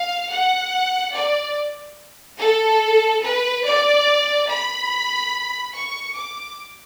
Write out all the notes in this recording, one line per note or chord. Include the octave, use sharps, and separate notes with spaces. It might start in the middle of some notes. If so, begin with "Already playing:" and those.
Already playing: F5
F#5
D5
A4
B4
D5
B5
C#6
D6